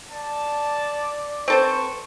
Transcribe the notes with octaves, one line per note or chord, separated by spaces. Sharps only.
D5 A5
C4 A4 B4 C5 C#6